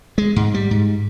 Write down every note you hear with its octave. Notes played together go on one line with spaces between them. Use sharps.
G#3
G#2
G3
G#2